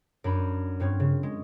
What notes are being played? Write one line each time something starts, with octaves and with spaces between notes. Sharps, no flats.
F#2 D4 B5
G2 C4 F4 C#5
C#3
G#3